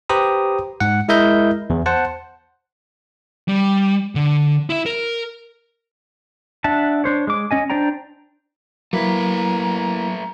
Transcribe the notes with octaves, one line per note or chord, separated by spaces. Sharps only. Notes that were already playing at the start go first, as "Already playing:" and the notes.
G4 B4 C5 A#5 D#6
G#2 F#5
G#3 E4 A#4 D#5 E5 G6
E2 E3
C5 F#5 A5
G3
D3
E4 E5
A#4
D4 E5 F#5 A5
D4 C5 C#5
G#3 D6
C#4 D#5 G#5
D4 C5 D5 G5 A#5
F#3 A3 A#3 E4 B4 A#5